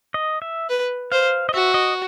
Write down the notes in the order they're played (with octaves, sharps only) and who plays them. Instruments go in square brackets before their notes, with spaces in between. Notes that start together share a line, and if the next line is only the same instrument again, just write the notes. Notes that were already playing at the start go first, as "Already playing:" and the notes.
[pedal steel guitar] D#5
E5
[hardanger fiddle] B4
[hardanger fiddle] C5 [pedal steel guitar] F5
[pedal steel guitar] D#5
[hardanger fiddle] F#4 [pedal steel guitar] E5
[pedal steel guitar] D#5